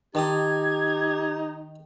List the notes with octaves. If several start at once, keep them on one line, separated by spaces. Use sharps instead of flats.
D#3 D#4 G4 A5 D#6 G#6